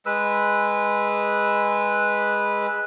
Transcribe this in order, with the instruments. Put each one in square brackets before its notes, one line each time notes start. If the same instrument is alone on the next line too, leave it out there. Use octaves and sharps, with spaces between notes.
[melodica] G#3 B4 E6